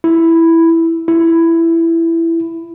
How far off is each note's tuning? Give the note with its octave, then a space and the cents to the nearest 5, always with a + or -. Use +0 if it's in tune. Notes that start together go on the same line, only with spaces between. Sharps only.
E4 +0
E4 +10